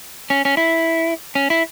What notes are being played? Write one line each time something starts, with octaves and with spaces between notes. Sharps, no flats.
C#4
C#4
E4
C#4
E4